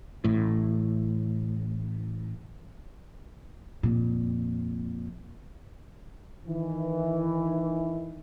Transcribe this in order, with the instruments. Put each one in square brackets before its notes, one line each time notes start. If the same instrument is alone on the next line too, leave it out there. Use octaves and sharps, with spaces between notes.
[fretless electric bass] A1 A2
[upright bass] F2 A#2
[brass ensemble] D#3 E3